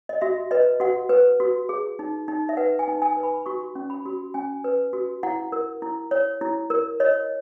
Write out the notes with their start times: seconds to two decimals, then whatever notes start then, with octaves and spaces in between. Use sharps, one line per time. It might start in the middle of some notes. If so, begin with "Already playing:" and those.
0.09 D#5
0.21 F#4 E5
0.51 B4 D#5
0.80 F#4 F#5
1.09 B4
1.40 F#4
1.69 G#4
1.99 D#4
2.28 D#4
2.49 E5
2.57 B4 F#5
2.79 G#5
2.88 D#4
3.02 G#5
3.17 B4
3.23 B5
3.46 F#4 C#6
3.75 C#4
3.90 B5
4.06 F#4
4.34 C#4 G#5
4.64 B4
4.93 F#4
5.23 E4 F#5
5.52 A#4
5.82 E4
6.11 C#5
6.41 E4
6.70 A#4
7.00 C#5 D#5